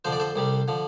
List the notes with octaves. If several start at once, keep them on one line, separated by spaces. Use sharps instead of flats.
F2 D3 F3 C5
D5
A4 C5
C2 C3 G3
D3 F3